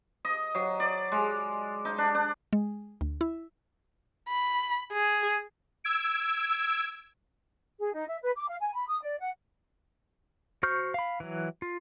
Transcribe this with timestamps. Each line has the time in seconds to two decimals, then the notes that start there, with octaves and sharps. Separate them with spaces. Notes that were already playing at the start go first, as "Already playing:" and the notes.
0.25 D#5
0.55 F#3
0.80 D5
1.12 G#3
1.85 D#4
1.98 D4
2.15 D4
2.53 G#3
3.01 D2
3.21 E4
4.29 B5
4.92 G#4
5.84 E6 G#6 D7
7.79 G#4
7.93 D#4
8.08 E5
8.23 B4
8.35 D6
8.49 F5
8.61 G#5
8.75 B5
8.88 D#6
9.03 D5
9.20 F#5
10.63 F#4 C5 C#6 F6 G6
10.94 F5 B5
11.20 E3 F#3
11.62 F4